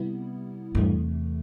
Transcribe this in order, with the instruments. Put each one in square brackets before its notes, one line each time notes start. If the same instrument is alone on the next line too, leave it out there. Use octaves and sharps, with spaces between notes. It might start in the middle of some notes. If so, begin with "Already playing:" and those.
Already playing: [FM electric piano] C3 G3 B3 E4
[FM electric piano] E2 C3 E3 A3 [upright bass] G2